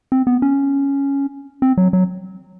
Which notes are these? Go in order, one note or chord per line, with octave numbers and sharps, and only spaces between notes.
C4
B3
C#4
C4
F#3
F#3